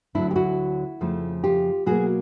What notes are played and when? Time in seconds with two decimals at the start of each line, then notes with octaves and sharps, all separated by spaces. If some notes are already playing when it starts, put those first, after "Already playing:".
0.15 D2 D3 F#3 D4 E4
0.31 G4
0.36 E4 F#4
1.01 F2 C#3 F3 A3
1.44 F4 G4
1.86 B2 F#3 A#3 F#4 G#4